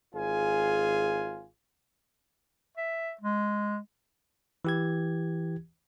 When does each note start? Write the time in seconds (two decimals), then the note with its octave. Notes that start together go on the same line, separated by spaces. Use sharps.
0.14 G#1 F4 G#4 G#5
2.77 E5
3.21 G#3
4.65 E3 G4 G#6